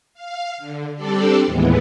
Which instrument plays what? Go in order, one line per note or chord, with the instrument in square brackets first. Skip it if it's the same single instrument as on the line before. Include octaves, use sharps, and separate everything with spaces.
[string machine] F5
D3
G3 C4 D4 G4 A4 D5
D#2 A2 E3 G#3 B3